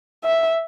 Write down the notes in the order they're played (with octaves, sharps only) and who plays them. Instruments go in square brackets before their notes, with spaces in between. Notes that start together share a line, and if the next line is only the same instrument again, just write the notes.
[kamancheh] E5